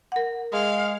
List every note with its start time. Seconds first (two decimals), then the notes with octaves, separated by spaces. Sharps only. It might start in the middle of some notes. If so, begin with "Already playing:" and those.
0.12 A#4 F#5
0.53 G#3 F5